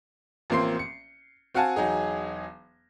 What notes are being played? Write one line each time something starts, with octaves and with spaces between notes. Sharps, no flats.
A1 F3 A#3 C4 C6 C7
C#7
C4 F#4 F5 F#5 G#5 A5
E1 F#3 D#4 G#4